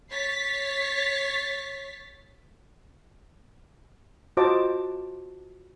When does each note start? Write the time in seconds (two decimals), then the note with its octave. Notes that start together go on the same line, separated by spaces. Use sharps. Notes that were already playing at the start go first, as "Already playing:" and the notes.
0.10 C#5 A6 B6 C7
4.37 F4 F#4 C5 D#5 A5 D6